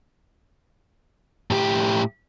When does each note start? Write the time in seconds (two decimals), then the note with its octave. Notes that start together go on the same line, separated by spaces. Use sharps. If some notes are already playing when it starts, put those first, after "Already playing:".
1.51 A2 G4